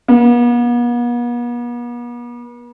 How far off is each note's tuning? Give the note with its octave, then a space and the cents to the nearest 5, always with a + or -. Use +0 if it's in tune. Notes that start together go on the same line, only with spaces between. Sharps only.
B3 -45